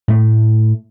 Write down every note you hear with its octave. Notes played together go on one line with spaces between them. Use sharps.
A2 A3